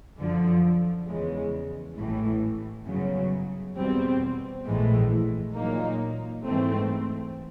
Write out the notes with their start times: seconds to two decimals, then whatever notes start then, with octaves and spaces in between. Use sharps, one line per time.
0.18 F#2 D3 F3
1.06 E2 C#3 E3 G#3
1.96 A1 A2 E3
2.86 G1 F#2 C#3 F#3
3.76 E2 B2 G3 C4
4.65 A#1 A2 E3 G#3
5.55 A#2 F#3 A#3 D#4
6.45 G#2 E3 A3 C4